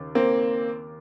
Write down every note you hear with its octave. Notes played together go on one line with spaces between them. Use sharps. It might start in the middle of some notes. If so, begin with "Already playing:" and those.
Already playing: D#2 C#3
A#3 C4